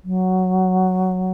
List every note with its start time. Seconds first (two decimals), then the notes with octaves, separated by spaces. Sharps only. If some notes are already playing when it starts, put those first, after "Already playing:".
0.04 F#3